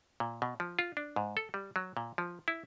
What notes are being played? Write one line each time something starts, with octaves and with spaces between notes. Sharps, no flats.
A#2
B2
F3
F4
D4
G#2
A4
G3
F#3
A#2
F3
E4